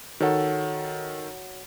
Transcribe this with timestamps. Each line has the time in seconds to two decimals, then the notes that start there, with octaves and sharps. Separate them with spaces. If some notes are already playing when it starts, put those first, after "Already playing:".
0.20 D#3 F#4 A4 C#5 F#5